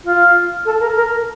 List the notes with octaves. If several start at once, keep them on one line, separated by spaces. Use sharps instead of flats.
F4
A4
A#4
A#4